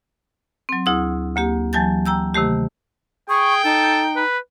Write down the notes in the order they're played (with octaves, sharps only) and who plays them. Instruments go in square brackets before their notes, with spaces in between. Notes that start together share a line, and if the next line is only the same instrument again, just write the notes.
[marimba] F#3 C4
D2 E4 G#4 D#6
D2 A#3 G4
E3 F#3 G#5 A5 G6 A6
G5 A#5 E6 G6
C3 D#3 A3 G4
[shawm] G#4 [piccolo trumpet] G5 [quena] C#6
[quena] D#4 [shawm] A4
[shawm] B4